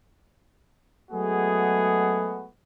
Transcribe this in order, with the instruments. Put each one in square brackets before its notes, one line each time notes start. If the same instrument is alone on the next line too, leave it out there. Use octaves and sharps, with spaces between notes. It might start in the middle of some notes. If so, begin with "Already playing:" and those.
[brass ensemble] F#3 G#3 A3 B3 F#4 G#4